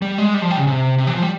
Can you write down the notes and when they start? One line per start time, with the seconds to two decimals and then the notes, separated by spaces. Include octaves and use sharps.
0.02 G3
0.18 G#3
0.34 G3
0.42 F3
0.50 G3
0.58 C#3
0.67 C3
0.98 C3
1.07 E3
1.14 F3
1.22 G3